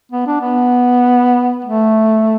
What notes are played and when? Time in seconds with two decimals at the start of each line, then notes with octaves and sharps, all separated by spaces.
0.11 B3
0.26 D4
0.40 B3
1.65 A3